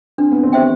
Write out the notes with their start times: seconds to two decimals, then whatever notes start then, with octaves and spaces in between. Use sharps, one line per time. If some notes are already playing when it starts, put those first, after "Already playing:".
0.18 C4 D4
0.32 B3
0.43 C4
0.53 G4 C5 E5 G5